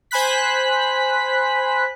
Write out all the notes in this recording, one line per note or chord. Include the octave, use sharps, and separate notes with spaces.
C5 G#5 B5 F#6 B6